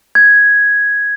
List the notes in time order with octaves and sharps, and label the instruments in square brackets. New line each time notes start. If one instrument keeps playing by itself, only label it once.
[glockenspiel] G#6